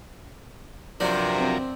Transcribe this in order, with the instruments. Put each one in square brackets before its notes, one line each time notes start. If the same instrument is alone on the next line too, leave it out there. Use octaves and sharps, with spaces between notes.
[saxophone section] G2 C3 [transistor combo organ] F3 F#3 A#4 [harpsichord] D4
[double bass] C4